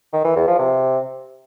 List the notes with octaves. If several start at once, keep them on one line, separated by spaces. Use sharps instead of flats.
D#3
E3
E2
F3
C3